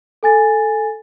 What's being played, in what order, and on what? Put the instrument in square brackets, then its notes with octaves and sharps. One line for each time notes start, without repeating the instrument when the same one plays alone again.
[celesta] A4 G#5 A6